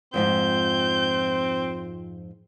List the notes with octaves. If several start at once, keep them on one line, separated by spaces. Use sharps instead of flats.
F2 G#2 F3 C4 G6